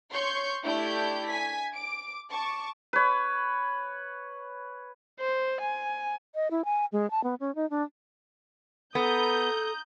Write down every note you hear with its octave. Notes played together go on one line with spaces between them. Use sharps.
C#5 C6 C#6 G6
A3 D4 E4 G4 G6
G#5 B6
D6 D7
A5 C#6 D6
B4 C#5
C5
G#5
D#5
E4
G#5
G#3
A5
B3
C#4
D#4
D4
B3 A4 A#5 D#6 G6